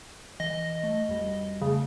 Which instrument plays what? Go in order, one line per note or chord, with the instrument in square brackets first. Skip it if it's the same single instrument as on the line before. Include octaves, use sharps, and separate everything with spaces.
[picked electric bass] E3 [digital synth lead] D#5
[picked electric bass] A3
F2 G3
[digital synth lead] C#3 [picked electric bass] F3 A3